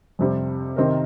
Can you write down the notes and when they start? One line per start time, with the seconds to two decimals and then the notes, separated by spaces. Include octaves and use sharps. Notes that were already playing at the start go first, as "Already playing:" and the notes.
0.19 F2 C3 G3 C4
0.76 C3 D#3 C4 D#4 A#4